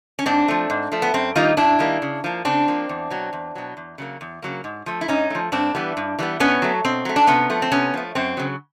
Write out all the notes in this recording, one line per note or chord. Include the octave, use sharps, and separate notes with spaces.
C#4
G#2 C4 D4
F3 A3
G#2
F3 A3
B3
F#2 C4
D#3 G3 A#3 D#4 F4
F#2 D4 E4
D#3 G3 A#3
C#3
F3 A#3
C#3 C4 D4
F3 A#3
E2
B2 F#3
E2
B2 F#3
E2
C#3 F#3 A#3
E2
C#3 F#3 A#3
G#2
F3 A3
E4
G#2 C#4 D#4
F3 A3
G2 C4 D4
E3 G3 B3
G2
E3 G3 B3
B2 B3 C#4
F#3 A3
B2 C4
F#3 A3
D4
C3 B3 C#4
F3 A3
C4
C3 B3 C#4
F3 A3
F#2 C4
C#3 F#3